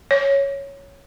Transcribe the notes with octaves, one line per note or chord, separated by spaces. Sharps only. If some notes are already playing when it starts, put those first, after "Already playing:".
C#5